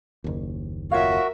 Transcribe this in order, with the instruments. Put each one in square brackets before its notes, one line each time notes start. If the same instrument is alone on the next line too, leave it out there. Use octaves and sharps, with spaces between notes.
[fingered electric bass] F#1 D#2
[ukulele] F4 C#5 F5 [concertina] F#4 [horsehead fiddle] A#4 E5